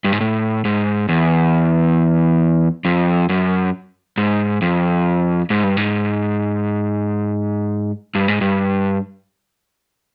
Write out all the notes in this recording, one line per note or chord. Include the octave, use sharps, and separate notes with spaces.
G2
G#2
A2
G#2
E2
F2
F#2
G#2
F2
G#2
G2
G#2
G2
G#2
G2